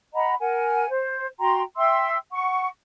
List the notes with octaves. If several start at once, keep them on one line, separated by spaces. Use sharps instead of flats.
D#5 F#5 A#5 B5
A#4 F#5 G#5
C5
F#4 G5 A#5 C6
E5 G5 C6 E6
F#5 C#6